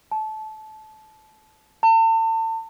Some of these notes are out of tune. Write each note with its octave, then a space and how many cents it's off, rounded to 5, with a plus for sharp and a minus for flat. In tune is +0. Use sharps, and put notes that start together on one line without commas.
A5 -20
A5 +40